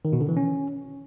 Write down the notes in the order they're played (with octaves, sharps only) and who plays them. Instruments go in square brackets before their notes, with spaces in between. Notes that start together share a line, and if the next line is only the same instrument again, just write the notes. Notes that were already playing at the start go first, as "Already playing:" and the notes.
[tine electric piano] D#3
B2
D3
E3
C#4